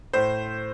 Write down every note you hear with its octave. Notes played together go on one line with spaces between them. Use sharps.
A2 C5